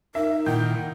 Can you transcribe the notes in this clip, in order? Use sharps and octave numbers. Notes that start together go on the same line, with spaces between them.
D#4 A#4 E5
A#2 D#3 E4 F#5 G5 G6